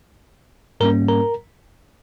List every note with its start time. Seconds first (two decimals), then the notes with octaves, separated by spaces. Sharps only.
0.80 G#2 G3 A#3 C#4 A#4 A#5
1.08 A#4 A#5